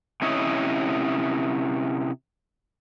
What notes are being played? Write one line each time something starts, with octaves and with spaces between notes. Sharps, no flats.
C3 C#4 E4 C#5 D#5